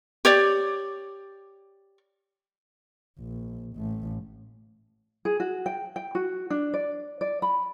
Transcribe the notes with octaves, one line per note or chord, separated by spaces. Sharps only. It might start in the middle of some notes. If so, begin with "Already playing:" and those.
G4 C#5 D5
A#1
A1 A3
G#4
F#4
G5
G5
F#4
D4
D5
D5
B5